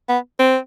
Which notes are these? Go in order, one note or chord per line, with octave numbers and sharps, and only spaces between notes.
B3
C4